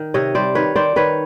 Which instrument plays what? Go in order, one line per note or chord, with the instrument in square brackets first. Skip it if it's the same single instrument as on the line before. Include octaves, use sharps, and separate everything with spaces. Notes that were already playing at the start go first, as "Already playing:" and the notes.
Already playing: [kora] D#3
C3 C#5 D#5
G3 C5 D5
D#3 B4 C#5
D#3 C5 D5
D#3 B4 C#5